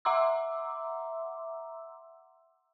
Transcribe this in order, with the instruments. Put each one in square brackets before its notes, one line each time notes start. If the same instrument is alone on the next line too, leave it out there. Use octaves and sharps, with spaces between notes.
[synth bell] E5 F#5 A#5 C6 D6 E6